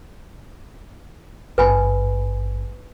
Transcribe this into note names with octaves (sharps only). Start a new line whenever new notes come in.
G#1 G2 B4 G#5 B5